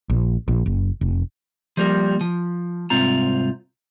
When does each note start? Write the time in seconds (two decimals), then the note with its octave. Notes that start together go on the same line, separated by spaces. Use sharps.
0.10 A#1
0.48 A#1
0.66 F#1
1.01 F1
1.77 F3 G3 A#3 A#4
2.21 F3
2.90 C2 G#2 C4 F4 A#5